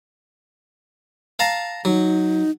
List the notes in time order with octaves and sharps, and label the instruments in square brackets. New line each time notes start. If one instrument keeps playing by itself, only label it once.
[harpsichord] F5 A5 A#5
[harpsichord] F#3 [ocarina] D#4